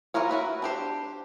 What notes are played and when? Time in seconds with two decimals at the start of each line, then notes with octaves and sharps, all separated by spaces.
0.14 E3 F4 F#4 A#4 C#5
0.29 E4 F#4 B4
0.62 D4 G4 C5